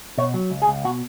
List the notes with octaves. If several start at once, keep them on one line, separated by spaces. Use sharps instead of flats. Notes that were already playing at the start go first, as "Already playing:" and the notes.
B2 C#5
F#3
C#2
G#4
C#2
B2 F#4